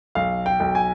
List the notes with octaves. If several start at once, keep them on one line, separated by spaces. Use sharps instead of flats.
B1 F5
G5
B1
G#5